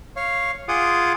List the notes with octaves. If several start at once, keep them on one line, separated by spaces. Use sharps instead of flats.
C#5 F5
F4 G#4 F#5 D6 D#6